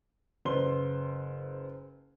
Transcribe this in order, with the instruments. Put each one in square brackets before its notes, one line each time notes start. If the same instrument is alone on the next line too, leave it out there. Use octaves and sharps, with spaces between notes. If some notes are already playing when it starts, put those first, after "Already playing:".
[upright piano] F#1 B4 C5 C6 G7